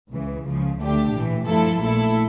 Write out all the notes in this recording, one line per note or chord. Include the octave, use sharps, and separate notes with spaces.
C#2 C#3 E3
C#2 C#3 F3
D2 D3 A3 D4 G4
A#1 A2 E3
G2 F3 A3 E4 A4
A#1 A#2 A3 E4 A4